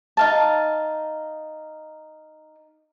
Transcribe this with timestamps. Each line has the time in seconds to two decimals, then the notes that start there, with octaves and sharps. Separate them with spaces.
0.17 D#4 F5 A5